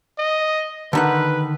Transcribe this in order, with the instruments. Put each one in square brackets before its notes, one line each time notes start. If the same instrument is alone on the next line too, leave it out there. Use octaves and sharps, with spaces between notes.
[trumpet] D#5
[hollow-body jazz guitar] D3 D#3 F#5 [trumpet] B4